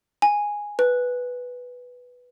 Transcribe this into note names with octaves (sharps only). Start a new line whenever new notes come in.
G#5
B4